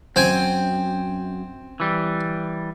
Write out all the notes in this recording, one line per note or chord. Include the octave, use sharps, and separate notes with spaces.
F#2 C4 G5 G#5
E3 G3